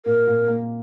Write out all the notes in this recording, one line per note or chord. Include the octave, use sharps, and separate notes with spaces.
A#2 A#4
A#2
A#3